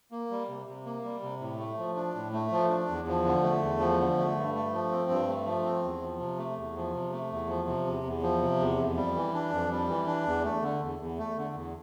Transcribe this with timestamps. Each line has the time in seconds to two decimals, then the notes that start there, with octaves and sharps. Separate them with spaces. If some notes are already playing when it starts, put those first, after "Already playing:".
0.12 A#3
0.30 G3
0.49 C3
0.67 C3
0.85 A#3
1.03 G3
1.22 C3
1.40 A2
1.59 A3
1.78 F3
1.96 D4
2.15 A2
2.33 A3
2.52 F3
2.69 D4
2.88 E2
3.07 F3
3.25 D3
3.43 A3
3.62 E2
3.80 F3
3.99 D3
4.17 A3
4.35 G2
4.54 A3
4.72 F3
4.91 C4
5.10 G2
5.27 A3
5.46 F3
5.65 C4
5.83 E2
6.01 F3
6.20 C3
6.38 A3
6.57 E2
6.75 F3
6.94 C3
7.12 A3
7.31 E2
7.48 F3
7.67 C3
7.86 E2
8.04 E2
8.22 F3
8.42 C3
8.60 E2
8.77 F2
8.96 G3
9.15 E3
9.34 D4
9.52 F2
9.71 G3
9.89 E3
10.07 D4
10.26 E2
10.44 A3
10.62 D3
10.81 E2
10.99 E2
11.18 A3
11.36 D3
11.55 E2